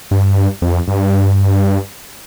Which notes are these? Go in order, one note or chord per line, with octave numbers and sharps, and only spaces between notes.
G2
F2
G2